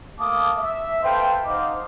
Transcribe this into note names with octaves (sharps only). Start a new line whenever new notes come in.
A3 A#3 F5 A5 D6 D#6
E5
A4 B4 C5 F5 G5
D#4 C5 D#5 F5 F#5 D6